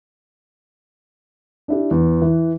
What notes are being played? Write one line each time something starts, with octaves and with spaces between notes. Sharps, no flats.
D4 E4 G4
E2
E3